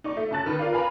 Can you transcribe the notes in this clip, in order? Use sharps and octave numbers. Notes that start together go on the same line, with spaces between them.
D#4 D5 C#6
A3
F#1 C#4 A5 F#6 A6
D#3 B4
F4 A#4 D5 F5
B4 F5 G#5 A#5 B5